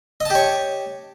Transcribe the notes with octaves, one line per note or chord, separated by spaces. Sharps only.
G4 C#5 D#5 A5